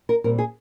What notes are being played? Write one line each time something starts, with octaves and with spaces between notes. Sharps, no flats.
A#4
A#2 G3 C4 A#4
G#4